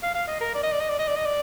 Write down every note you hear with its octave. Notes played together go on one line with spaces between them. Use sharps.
F5
F5
D#5
A#4
D5
D#5
D5
D#5
D5
D#5
D5
D#5
D5